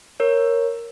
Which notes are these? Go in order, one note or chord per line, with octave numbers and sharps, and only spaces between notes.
A#4 C#5